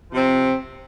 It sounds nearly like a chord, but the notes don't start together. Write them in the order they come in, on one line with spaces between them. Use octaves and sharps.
F3 C3 C4